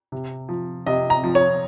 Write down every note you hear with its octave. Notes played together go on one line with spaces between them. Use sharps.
C3
F3
C3 D#5
A#5
F3
C#5